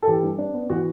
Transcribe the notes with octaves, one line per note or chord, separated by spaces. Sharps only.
A4
E3 G4
G2
D4
B3
E3 F#4